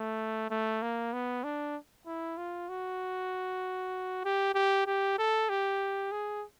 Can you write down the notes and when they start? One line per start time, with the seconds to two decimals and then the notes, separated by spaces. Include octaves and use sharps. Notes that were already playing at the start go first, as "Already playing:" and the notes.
Already playing: A3
0.50 A3
0.82 A#3
1.13 B3
1.44 D4
2.07 E4
2.37 F4
2.69 F#4
4.25 G4
4.55 G4
4.86 G4
5.18 A4
5.49 G4
6.11 G#4